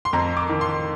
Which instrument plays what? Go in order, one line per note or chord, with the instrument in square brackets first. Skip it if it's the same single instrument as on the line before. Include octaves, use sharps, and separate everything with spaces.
[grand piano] C6
F2 A#5
D6
D#3
C6